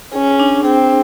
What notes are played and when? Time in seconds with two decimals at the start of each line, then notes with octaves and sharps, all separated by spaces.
0.13 C#4 G#4
0.40 D4
0.65 C4 G#4